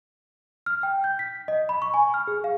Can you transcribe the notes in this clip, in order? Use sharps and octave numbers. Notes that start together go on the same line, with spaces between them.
F6
G5
G6
B6
D#5
B5
C#6
G#5
F6
G#4
F5